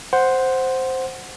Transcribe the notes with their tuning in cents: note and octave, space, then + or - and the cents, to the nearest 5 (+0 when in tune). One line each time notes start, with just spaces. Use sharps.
C5 +0 F#5 +0